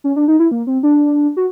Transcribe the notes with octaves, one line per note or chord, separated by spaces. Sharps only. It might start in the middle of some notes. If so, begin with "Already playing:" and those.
C#4
D4
D#4
E4
A#3
C4
D4
F#4